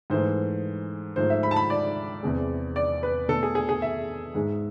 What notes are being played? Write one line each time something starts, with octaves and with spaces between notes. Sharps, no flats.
G#2 E3 A3 C5
G#2 F3 A3 C5
E5
B5
A5
B5
D5
E2 C3 G#3
D5
B4
B2 A3 A4
G#4
G#4
G#4
E5
G#2 G#3